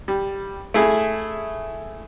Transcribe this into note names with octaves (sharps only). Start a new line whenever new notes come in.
G3
A3 E4 G#4